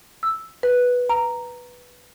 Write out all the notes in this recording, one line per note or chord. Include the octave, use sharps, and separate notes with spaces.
E6
B4
A#5